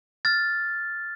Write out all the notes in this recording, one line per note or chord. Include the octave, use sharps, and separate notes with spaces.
F6 A6